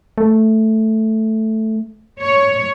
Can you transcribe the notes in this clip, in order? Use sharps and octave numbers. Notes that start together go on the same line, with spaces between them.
A3
C#5